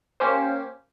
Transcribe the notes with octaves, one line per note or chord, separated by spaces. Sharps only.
A#3 C#4 G4 C5